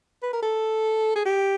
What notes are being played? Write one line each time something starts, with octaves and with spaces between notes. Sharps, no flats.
B4
A#4
A4
G#4
G4